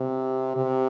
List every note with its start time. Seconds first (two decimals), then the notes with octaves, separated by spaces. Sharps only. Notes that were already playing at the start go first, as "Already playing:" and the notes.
Already playing: C3
0.56 C3